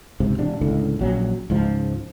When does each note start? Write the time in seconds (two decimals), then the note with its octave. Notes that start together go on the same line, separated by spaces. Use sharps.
0.20 C#2 G#2 C3
0.38 E1 C3 D4
0.61 C#2 A2 D3
0.99 A#1 F#3 C#4
1.50 C#2 G#2 F3